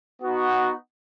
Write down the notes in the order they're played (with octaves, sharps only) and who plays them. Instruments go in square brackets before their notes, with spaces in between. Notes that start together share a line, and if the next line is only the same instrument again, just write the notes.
[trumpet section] B3 D#4 F#4